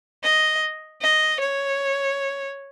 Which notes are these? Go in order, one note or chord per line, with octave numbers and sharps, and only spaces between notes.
D#5
D#5
C#5